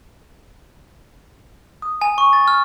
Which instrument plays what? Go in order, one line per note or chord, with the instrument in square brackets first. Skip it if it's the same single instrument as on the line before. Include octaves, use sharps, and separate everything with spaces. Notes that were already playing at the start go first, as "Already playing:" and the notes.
[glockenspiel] D#6
G#5
C#6
A6
F6